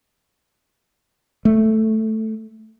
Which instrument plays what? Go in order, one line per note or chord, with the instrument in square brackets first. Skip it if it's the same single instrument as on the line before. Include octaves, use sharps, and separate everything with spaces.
[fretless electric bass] A3